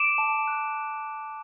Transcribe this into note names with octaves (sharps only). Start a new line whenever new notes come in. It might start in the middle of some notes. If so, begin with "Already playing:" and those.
Already playing: D6 D7 E7
A5
F#6